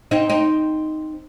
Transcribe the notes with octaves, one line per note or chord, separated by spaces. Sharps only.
C4 D#4
C4 D#4